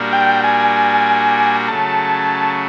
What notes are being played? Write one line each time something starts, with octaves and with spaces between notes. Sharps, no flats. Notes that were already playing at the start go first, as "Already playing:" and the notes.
Already playing: A#2 G3 A#3 D4 F#4
G5
G#5
C#3 F#3 A3 A5